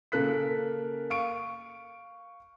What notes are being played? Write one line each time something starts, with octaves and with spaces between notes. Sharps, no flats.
C#3 A#3 A4 A#4 F#6 B6
F5 C#6 D7